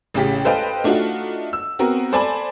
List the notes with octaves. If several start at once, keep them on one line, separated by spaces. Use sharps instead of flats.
A1 C#3 G4 B6
A4 B4 C5 D#5 F5 G5
A3 D4 D#4 F4 F#4
E6
B3 C4 F#4 A#4
A4 C5 D5 G#5 A5 B5